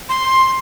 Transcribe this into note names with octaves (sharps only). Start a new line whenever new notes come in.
C6